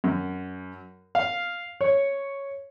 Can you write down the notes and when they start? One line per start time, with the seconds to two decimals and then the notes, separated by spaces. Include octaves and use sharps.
0.04 F#2
1.15 F5
1.81 C#5